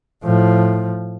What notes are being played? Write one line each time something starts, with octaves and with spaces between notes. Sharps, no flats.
A2 F3